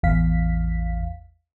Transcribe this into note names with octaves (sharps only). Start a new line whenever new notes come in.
A1 E2 F5 B6